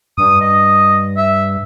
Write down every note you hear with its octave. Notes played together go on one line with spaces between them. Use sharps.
G2 D#6
D#5
E5